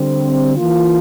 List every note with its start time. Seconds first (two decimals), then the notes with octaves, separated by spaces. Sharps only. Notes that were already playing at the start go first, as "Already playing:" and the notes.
Already playing: D3 G3 C4
0.57 E3 A#3 F4